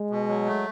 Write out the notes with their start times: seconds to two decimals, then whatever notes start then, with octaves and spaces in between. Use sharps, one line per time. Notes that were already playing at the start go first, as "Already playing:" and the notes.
Already playing: G#3
0.10 B2
0.29 F#3
0.46 A3